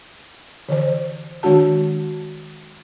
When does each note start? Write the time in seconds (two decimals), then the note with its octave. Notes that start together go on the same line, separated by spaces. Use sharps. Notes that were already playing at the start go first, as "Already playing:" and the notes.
0.69 D3 E3 C5
1.43 D#3 G#3 D4 F#4 A5